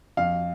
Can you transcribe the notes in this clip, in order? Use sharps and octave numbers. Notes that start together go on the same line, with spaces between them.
F2 F5